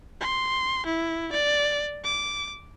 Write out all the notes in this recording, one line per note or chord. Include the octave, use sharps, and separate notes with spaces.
C6
E4
D5
D6